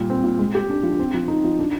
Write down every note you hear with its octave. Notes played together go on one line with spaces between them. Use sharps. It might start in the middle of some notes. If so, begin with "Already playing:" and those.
Already playing: A#2 G3
C4
A#2
G#3
G4
D4
F3
C4
F3
D#4
F3
D4